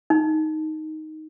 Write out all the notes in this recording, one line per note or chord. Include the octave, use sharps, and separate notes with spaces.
D#4